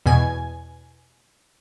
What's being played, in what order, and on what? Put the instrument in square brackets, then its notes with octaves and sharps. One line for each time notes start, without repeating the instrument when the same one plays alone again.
[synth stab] E2 B2 G#5